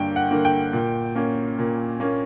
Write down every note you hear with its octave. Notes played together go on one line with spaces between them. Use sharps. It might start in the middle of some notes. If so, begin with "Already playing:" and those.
Already playing: G2 D3 A#3 G5
F#5
D3 A#3
G5
A#2
A#3 C#4
A#2
A#3 C#4